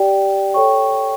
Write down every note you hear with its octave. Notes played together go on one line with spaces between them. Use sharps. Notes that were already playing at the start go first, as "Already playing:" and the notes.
Already playing: G4 D5 G5
A4 C#5 G5 C#6